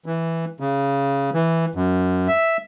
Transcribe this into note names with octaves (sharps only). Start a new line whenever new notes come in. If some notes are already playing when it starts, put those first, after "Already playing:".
E3
C#3
E3
F#2
E5